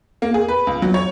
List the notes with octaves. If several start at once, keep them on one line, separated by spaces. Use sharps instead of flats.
A#3
G#4
B4
C#2
F#3
C#5